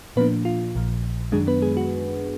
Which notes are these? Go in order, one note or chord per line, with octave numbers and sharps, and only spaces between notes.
A#2 F3 A#3 B3 D4 B4
F4
A#1 A#2 F3
F#2 D#3 F#3 G#3 D4 G#4
B3 B4
G#3 G#4
F#4